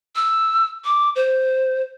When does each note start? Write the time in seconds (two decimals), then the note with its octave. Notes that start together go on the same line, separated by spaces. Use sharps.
0.16 E6
0.85 D6
1.16 C5